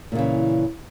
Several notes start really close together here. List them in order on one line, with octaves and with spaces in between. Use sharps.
A#2 C#3 E3